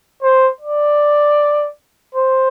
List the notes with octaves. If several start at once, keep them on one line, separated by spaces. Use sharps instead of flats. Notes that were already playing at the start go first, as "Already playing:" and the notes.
C5
D5
C5